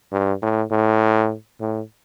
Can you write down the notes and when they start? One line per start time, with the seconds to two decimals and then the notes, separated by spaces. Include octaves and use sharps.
0.12 G2
0.42 A2
0.71 A2
1.60 A2